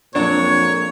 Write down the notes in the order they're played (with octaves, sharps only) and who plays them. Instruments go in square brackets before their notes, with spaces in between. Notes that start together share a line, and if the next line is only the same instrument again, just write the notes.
[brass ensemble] F2 A#2 [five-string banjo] F#3 G#3 D4 [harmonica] C#5